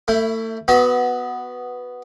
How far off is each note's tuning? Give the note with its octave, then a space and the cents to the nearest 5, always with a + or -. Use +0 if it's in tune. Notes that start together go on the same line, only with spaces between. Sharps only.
A3 +35 E4 +0
B3 +5 F#4 +0 D#5 +45